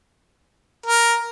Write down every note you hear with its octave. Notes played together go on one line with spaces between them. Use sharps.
A#4